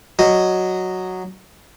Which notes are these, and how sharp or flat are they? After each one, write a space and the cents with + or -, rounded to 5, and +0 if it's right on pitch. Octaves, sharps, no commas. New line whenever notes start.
F#3 +0 D#5 -5